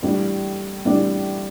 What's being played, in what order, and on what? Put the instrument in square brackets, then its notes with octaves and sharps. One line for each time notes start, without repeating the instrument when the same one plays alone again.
[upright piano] A2 E3 G3 D4
A2 E3 G3 D4